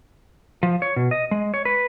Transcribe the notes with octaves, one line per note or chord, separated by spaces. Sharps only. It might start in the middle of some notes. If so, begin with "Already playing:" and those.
F3
C#5
B2
D#5
G#3
C#5
B4